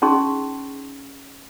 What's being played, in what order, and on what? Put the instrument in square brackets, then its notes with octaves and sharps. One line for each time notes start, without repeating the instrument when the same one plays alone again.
[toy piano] C#4 D#4 G#4 C6 C#6